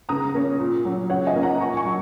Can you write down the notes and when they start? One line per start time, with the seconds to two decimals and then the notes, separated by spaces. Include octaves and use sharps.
0.09 C#3 A#5 D#6
0.34 A#3 C#4
0.60 A#2
0.85 F#3 C#4
1.10 C#3 C#5 F#5
1.27 D#5 G#5
1.35 A#3 C#4
1.43 F#5 A#5
1.60 A#2 G#5 C#6
1.77 G#5 C#6
1.85 F#3